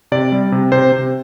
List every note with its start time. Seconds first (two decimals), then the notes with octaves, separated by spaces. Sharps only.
0.12 C3 D5
0.32 G3
0.52 C3
0.72 C3 C5
0.92 C3